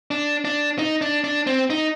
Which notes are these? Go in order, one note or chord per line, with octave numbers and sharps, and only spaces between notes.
D4
D4
D#4
D4
D4
C4
D#4